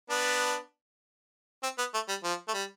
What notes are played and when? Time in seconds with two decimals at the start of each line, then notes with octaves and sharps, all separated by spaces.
0.10 B3 D4
1.63 C4
1.78 B3
1.94 A3
2.08 G3
2.24 F3
2.48 A3
2.54 G3